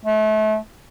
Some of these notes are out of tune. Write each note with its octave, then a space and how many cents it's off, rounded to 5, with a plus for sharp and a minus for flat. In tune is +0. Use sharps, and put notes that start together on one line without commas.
A3 -35